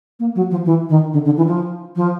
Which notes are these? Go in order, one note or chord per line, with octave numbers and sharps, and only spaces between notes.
A#3
F#3
F3
E3
D#3
D3
D3
E3
F3
F3